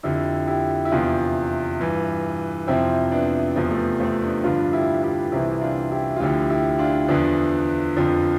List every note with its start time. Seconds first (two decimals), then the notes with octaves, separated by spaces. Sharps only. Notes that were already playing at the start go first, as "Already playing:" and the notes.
0.03 F2 D3 F3 E4 G4
0.47 E4 G4
0.85 E4
0.91 E2 C3 F3 D4 F4
1.80 G2 E3
2.67 F2 C3 F3 C4 E4
3.12 B3 D4
3.56 E2 C3 F3
3.71 A3
3.78 B3
4.00 A3 C4
4.22 B3 D4
4.44 G2 D3 F3 D4 F4
4.73 E4 G4
5.03 E4 G4
5.32 C2 C3 E3 C4 E4
5.61 D4 F4
5.91 E4 G4
6.16 F4
6.20 D2 D3 F3 E4 G4
6.50 E4 G4
6.79 D4 F4
7.08 E2 D3 F3 B3 D4
7.96 F2 D3 F3